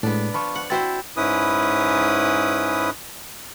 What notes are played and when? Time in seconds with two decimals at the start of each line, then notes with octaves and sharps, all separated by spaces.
0.03 A2 G#3 B3 D4
0.34 F3 B5 C#6
0.55 F#5
0.70 C4 E4 F#4 C5 A6
1.17 G#2 C#4 E4 B4 D#6